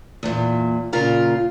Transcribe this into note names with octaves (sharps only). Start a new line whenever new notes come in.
E2 A#2
A#2 C#3 F4 A#4 A#5